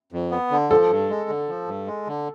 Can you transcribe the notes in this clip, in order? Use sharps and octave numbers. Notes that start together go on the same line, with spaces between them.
F2
B3
D3
F3 A4
G2
G#3
D3
F3
G2
G#3
D3